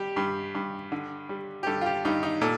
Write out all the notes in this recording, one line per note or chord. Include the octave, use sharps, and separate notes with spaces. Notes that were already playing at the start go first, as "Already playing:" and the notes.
Already playing: G3 G4
G2
G2
D3
G3
G4
G2 A4
F4
G4
G2 D#4
D#4
A#2 A4